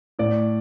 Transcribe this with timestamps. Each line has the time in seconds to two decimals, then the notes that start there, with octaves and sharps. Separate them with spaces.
0.19 A2 D5